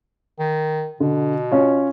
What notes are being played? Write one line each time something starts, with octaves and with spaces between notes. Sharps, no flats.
D#3
B2 D3
C#4 F4 C#5